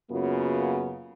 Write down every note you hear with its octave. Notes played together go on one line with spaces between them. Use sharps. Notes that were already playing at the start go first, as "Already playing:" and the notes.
F#2 C#3 A#3 B3 F4 F#4